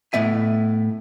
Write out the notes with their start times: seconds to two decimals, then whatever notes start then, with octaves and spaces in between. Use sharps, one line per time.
0.13 A2 B3 E5 G#5